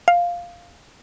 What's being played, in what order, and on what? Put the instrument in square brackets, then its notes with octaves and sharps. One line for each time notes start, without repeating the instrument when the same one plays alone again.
[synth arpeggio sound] F5